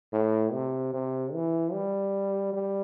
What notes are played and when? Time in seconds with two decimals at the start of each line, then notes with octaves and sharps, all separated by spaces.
0.13 A2
0.53 C3
0.93 C3
1.34 E3
1.73 G3
2.53 G3